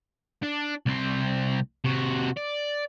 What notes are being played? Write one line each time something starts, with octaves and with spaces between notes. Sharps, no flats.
D4
C2 C4
C3 F#4
D5